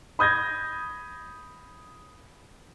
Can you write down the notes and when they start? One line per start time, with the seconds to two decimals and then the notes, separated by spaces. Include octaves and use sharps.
0.19 B5 D#6 G6 G#6 A#6